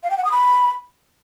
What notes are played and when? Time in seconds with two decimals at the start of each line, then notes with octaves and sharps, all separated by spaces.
0.03 F5
0.11 G5
0.18 F#5
0.25 D#6
0.32 B5